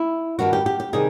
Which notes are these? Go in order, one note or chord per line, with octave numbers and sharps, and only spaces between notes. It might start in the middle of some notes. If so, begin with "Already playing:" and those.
Already playing: E4
G2 D#3 G3 F#4
G4
G4
G4
C3 D#3 G3 C4 D#4 G#4